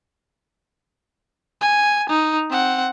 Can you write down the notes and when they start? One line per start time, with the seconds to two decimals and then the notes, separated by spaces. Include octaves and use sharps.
1.61 G#5
2.09 D#4
2.50 C4 F#5